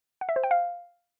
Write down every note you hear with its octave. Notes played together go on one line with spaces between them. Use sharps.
F#5
E5
C5
G5
F5